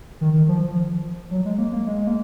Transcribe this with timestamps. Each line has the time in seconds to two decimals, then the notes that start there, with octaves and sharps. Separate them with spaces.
0.21 D#3
0.34 D#3
0.48 F3
0.62 F3
1.31 F#3
1.45 G#3
1.58 A#3
1.73 A#3
1.87 G#3
2.07 A#3